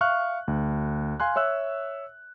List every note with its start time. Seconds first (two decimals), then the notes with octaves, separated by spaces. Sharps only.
0.01 E5 F5 C#6 F6 F#6
0.48 D2
1.20 F5 G#5 C6 F#6
1.36 C#5 E5 E6 F#6